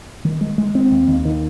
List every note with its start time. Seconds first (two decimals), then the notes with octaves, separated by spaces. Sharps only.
0.25 D#3
0.41 G#3
0.58 G#3
0.75 C4
0.91 D#2
1.08 D#2
1.25 D#3